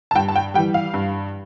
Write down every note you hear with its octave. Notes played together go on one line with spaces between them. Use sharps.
A5
G2 G5
A5
G5
E3 G3 G5
F5
G2